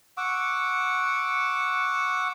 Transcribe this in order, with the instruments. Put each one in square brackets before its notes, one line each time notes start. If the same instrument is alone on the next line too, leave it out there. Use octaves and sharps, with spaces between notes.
[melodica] F#5 C#6 D6 E6